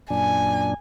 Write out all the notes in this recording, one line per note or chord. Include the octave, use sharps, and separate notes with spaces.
F#2 A#2 D4 G#5